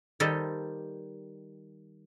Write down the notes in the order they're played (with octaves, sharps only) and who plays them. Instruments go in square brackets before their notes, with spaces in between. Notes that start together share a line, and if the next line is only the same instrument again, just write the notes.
[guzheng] D#3 G3 G4 A4 C5 D#5